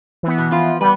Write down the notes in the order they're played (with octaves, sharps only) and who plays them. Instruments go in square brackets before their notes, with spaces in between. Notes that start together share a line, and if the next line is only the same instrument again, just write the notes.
[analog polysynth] E3 B3
[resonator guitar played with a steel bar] B2
F3 F4
[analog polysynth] G3 [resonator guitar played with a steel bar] B3 B4